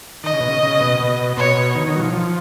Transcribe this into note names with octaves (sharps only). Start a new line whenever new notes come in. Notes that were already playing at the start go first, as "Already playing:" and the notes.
D#3 D#5
C#3
B2
C#3
C#3
B2
B2
B2 C#5
D#3
D#3
F#3
F3
F3